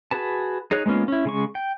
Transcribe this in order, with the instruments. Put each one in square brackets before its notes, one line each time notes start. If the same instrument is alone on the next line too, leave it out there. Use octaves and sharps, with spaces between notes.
[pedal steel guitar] F#4 G#4 B4 A5
D#4 G#4 C#5 F#6
G#3 A#3 B3 C#4 F4
C#4 E4
C#3 G#3 C#6
G5